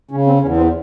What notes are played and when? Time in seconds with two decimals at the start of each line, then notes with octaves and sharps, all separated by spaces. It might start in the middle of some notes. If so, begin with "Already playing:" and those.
0.11 C#3 C#4
0.27 C4
0.42 E2 C#4
0.57 C4